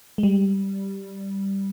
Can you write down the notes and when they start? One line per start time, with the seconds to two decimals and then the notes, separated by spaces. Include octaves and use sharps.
0.18 G#3
0.23 G3